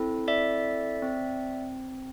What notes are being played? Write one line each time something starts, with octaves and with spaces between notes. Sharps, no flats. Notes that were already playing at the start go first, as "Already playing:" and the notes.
Already playing: C4 E4 A4
D5 E5
C4